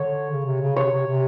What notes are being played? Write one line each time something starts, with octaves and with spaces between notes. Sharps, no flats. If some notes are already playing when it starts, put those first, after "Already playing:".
Already playing: D3 C#5
C#3
C3
C#3
C3 C#5
C3
C3